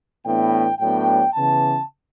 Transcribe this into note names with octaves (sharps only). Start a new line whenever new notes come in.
A2 E3 B3 D4 G5
A2 F#3 B3 D4 G5
C#3 E3 B3 A5